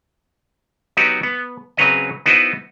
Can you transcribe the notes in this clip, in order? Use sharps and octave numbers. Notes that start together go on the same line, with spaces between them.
F#3 B3 D#4 F#4 G4
B3
C#3 F#3 C4 B4 C#5 D#5
B3 D#4 E4 F#4 B4 C5